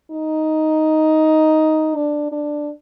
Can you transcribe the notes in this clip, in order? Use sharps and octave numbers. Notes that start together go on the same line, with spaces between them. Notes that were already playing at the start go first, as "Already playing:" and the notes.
D#4
D4
D4